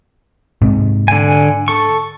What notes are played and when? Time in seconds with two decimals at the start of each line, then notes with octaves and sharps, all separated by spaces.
0.62 G#2 C3
1.08 D3 G#5
1.68 A4 C#6